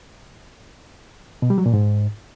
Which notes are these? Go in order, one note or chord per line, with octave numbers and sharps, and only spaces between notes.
B2
G3
F#3
A#2
G#2